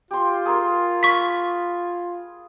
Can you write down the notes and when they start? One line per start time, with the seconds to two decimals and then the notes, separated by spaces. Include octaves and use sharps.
0.11 F4 G4 C6
0.45 G#4 A#4 C6
1.03 B5 C#6 B6